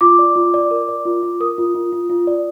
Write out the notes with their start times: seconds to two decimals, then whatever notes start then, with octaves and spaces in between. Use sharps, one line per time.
0.01 F4 D6
0.19 D5
0.36 F4
0.54 D5
0.71 A#4
0.88 D5
1.05 F4
1.23 F4
1.40 A#4 D#6
1.58 F4
1.75 F4
1.92 F4
2.10 F4
2.27 D5